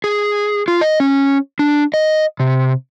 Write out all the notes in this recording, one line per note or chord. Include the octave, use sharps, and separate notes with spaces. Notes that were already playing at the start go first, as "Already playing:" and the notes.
G#4
F4
D#5
C#4
D4
D#5
C3